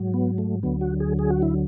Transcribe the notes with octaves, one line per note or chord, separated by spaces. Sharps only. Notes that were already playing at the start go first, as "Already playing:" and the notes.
Already playing: G#2 F#3
B3
A3
D2 D3 F#3 B3
F#4
G#4
G#4
F#4
E4